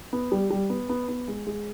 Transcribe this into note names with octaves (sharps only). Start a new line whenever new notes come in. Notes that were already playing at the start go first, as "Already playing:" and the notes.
B3
G3
G3
B3
B3
B3
G#3
G#3